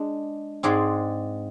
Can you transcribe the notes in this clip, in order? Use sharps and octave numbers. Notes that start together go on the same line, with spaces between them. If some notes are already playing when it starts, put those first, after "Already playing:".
Already playing: G#3 D4
G#2 G#3 C4 G#4 D5